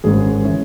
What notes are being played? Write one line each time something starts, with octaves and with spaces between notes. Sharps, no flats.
G#1 G#2 G#3 C#4 G#4
E3 C#4